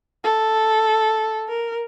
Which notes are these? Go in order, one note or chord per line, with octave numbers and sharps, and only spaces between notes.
A4
A#4